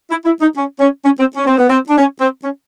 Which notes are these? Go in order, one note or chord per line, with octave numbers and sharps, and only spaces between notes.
E4
E4
D#4
C#4
C#4
C#4
C4
C#4
C4
B3
C4
D4
C#4
C4
C#4